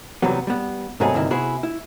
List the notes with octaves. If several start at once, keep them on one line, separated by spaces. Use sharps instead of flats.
C3 E3 F#3 G3 B3
G3 B3
G#2 C3 F#3 A3 B3 G#4
D2 G2 C3 D#3 E4
C3 B3 E4 F#4 G#4
E4